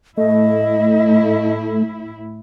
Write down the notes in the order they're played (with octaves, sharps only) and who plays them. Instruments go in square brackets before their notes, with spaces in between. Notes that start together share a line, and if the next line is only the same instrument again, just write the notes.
[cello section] A2 E4 [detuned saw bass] A3 [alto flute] D#5